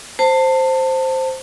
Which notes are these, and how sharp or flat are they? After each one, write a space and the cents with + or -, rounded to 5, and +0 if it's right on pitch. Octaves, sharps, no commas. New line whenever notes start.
C5 +0 A5 +25